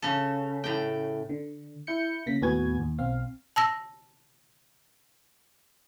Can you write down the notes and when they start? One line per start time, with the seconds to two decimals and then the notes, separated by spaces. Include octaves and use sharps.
0.02 C#3 A4
0.64 A2 G5
1.29 D3
1.87 E4 G6 C#7
2.26 C#3 A#3 A#6 B6
2.41 D#2 A2 B3 F#4 G#5 G#6
2.79 D#2
2.98 B1 C4 F5
3.56 A5 E6 A#6